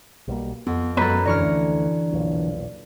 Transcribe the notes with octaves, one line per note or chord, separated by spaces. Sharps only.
B1 G3 A#3
F2 B3
F#2 F#3 G#3 B3 A4 B4 C#5 A#5
E1 D3 E3 D5 A#5 C#6 F6
D2
E1 B1 A#2